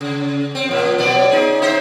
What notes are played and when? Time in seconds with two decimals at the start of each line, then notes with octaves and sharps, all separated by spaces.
0.01 C#3
0.55 C4
0.68 A#2 F3
0.98 B2 F#3 D5
1.30 D#4 G#4
1.62 D#4 C5 E5